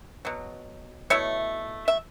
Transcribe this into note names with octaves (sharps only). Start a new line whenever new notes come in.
B2 F#3
B2 A3 E4 C#5 E5
E5